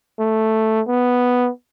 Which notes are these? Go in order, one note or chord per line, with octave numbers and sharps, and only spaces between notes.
A3
B3